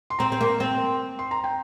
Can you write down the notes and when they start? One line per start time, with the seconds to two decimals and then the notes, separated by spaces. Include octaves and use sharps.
0.10 C6
0.19 C4 A#5
0.32 C4
0.41 A#3
0.60 C4
1.19 C6
1.31 A#5
1.44 G5